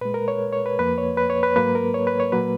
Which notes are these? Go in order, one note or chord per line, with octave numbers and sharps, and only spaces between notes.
A#2 G#3 B4
A#4
C#5
C#5
B4
F2 F3 A#3 B4
C#5
B4
C#5
B4
G#2 F#3 A#3 B4
A#4
C#5
B4
C#5
A#2 F#3 A#3 B4